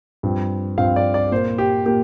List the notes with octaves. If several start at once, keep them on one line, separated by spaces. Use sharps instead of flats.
G2 F3 C4
G2 F3 C4 F5
D5
D5
A#2 A#3 C5
G4
A#2 A#3 G4